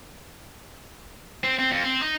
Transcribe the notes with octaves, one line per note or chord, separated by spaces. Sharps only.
C4
C4
F2
C4
D#4